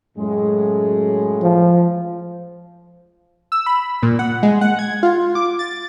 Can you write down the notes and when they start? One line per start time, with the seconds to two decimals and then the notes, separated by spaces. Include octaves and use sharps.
0.17 F#2 A2 G#3
1.43 F3
3.52 E6
3.66 B5
4.03 A#2
4.19 F#5
4.43 G#3
4.61 F#5
4.79 G#6
5.03 F4
5.35 D6
5.59 A6